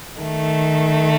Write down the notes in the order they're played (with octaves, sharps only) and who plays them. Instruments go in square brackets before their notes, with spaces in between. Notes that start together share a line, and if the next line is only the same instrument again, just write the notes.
[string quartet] D#3 A3